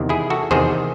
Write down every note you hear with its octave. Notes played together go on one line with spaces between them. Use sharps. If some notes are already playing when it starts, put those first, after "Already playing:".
Already playing: E2 C3 D#3
E4 G#4
F#4 A4
E2 C3 D#3 G#4 C5